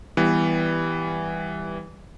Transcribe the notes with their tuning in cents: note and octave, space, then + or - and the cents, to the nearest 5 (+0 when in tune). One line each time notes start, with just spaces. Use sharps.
E3 -5 G3 +10 B3 +0